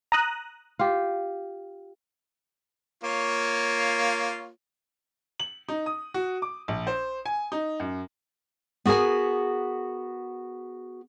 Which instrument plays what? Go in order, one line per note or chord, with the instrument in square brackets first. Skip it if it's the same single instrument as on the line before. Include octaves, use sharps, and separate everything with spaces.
[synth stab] A#5 D#6 F#6
[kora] F4 G4
[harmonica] A#3 F4 C#5
[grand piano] F#7
D#4
D#6
F#4
D6
A#1
C5
G#5
D#4
F#2
[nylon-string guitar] B3 F#4 G#4 A#4 G#5